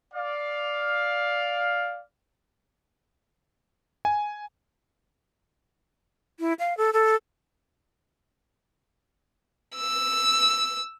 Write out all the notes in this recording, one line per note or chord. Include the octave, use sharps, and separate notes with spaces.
D5 F5
G#5
E4
F5
A4
A4
E6